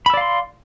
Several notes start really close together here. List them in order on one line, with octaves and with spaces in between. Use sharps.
B5 E6 D5 F5 C6